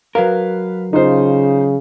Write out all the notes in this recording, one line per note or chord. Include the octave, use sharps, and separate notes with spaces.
F#3 A#4 B4 F5
C#3 D#4 F4 C5